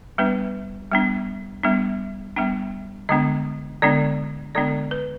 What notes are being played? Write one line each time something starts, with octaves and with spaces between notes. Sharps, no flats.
G3 B3 D4 B4
G3 B3 D4
G3 B3 D4
G3 B3 D4 G5
D3 G#3 B3 D4 D#5
D3 G#3 B3 D4 D5
D3 G#3 B3 D4 D5
B4